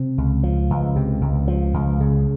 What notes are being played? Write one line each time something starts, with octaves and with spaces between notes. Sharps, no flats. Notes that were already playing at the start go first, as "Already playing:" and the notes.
Already playing: C3
C#2
F3
C#2
C3
C#2
F3
C#2
C#3